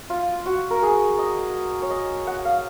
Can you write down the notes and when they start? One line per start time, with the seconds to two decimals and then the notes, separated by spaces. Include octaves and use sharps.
0.10 F4
0.46 F#4
0.70 A#4
0.83 G#4
1.18 D#5
1.82 C#5
1.90 D#5
2.27 F#5
2.45 F5